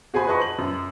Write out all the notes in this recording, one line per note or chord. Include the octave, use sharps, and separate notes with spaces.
F#4 G#4 C5 G#5 B5
B4 C5 D#5 A5 B5 C#6
F#7
F#2